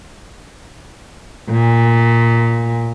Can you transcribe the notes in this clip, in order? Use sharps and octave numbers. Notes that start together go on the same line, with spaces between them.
A#2